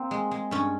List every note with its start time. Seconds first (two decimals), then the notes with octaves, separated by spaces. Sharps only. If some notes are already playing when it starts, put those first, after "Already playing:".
Already playing: A#3 C4
0.11 G#3
0.31 G#3
0.51 G2 C#4